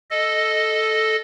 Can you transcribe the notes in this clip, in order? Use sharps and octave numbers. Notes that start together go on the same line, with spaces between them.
A4 D#5